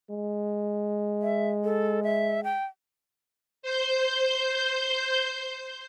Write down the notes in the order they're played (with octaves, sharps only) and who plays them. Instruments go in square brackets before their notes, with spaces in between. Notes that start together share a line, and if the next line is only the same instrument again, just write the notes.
[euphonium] G#3
[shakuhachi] E5
A4
E5
G5
[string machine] C5 G6